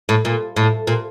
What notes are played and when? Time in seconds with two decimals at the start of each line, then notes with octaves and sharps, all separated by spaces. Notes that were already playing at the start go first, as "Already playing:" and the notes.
0.09 A2
0.25 A#2
0.57 A2
0.87 A#2